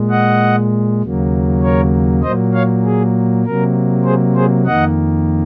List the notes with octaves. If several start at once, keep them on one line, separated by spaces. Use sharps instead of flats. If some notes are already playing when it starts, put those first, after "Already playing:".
Already playing: A#2 G#3
D#5 F#5
D#2 C#3 F#3 A#3
A#4 C#5
A#2 F#3 A#3 C5 D#5
C#5 F5
G#4
C3 F#3 A#3 A#4
G#4 C5
G#4 C5
F2 D#3 A#3 D#5 F#5